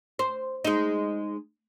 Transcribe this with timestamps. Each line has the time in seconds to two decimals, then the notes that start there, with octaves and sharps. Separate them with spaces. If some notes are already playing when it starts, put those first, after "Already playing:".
0.19 C5
0.64 G#3 D#4